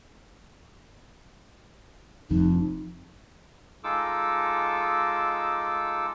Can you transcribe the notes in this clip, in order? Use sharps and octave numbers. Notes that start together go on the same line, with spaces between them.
F1 F2 D#4
G#3 D#4 F4 A4 D6 E6